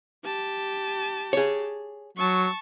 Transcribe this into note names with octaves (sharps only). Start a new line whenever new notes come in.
G4 A5
G#4 C#5
F#3 A5 C#6